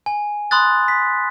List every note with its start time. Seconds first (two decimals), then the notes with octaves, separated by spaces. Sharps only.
0.06 G#5
0.51 B5 C6 D#6 F#6 A6
0.88 B6